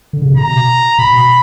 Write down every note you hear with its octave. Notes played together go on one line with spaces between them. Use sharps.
D3
C#3
C3
B2 A#5
B2 B5